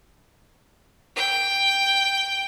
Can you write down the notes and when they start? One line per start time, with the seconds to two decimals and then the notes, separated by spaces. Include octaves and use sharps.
1.16 G5